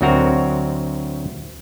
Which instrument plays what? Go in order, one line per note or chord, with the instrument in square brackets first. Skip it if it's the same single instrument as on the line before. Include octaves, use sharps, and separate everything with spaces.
[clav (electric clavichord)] D2 F#3 C4 F#4 A#4 A#5